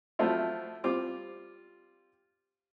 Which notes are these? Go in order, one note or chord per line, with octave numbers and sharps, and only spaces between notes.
F3 F#3 A3 C4 E4 F4
G3 C4 F4 D6